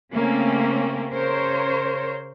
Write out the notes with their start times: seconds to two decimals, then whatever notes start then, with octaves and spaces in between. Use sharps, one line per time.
0.13 C#3 A3 A#3 C4 C#4
1.11 C#3 A#4 C5 C#5